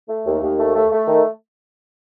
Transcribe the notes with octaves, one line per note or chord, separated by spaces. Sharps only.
A3
D#2
D#2
A3
A3
A3
D#3